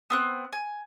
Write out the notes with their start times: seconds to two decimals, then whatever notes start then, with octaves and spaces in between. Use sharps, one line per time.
0.10 B3 C4 F#6
0.53 G#5